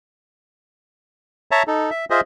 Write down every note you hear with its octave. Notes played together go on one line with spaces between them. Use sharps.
C#5 E5 A5 A#5
D#4 A4
E5
F4 G#4 C5 D#5 E5